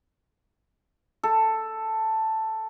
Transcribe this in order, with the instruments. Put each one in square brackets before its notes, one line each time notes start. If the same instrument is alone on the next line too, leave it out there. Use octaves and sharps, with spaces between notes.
[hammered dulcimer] A4